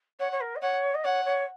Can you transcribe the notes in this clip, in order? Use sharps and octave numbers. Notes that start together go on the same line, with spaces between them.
C#5 F#5
C#5
A#4
D#5
C#5 F#5
D#5
C#5 F#5
C#5